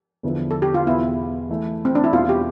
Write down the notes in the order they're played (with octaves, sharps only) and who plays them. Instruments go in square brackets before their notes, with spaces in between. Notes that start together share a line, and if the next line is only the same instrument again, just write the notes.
[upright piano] E2 D3 F3 B3 E4
[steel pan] A4
G4
F4
[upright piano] E2 B2 B3 [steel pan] E4
[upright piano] E3 A3 E4
[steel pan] C4
D4
E4
[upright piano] E2 B2 G3 B3 [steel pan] F4
[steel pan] G4